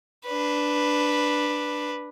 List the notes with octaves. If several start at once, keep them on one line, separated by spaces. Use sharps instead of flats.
D4 B4